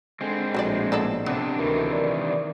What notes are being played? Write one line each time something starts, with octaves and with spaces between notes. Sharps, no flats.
D3 G#3 C4
A#1 A2 F#4 C5 D5
B3 A4 D5
C3 B3 D4
D2 C3 D#3 E3 A#4
D5